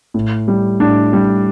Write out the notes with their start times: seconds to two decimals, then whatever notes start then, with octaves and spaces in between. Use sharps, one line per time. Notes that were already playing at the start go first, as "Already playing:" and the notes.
0.14 A2
0.48 G3
0.80 A2 D4
1.13 G3